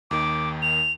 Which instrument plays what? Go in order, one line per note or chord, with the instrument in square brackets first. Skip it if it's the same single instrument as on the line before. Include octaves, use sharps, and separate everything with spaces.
[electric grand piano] D#2 D#3 [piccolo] D6
[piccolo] F7